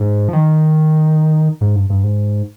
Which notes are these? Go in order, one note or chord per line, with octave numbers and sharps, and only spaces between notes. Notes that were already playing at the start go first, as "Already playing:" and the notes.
Already playing: G#2
F3
D#3
G#2
G2
G2
G#2